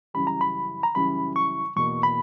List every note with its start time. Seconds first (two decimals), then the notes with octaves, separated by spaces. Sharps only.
0.14 F#2 C#3 E3 G3 B5
0.27 A#5
0.41 B5
0.83 A#5
0.95 F#2 C#3 E3 G3 B5
1.36 C#6
1.76 E2 B2 A#3 C#6
2.03 B5